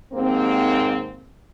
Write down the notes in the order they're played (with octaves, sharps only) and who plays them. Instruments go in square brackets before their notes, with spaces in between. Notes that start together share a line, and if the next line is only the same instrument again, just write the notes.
[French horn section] D#2 G#2 A#3 C4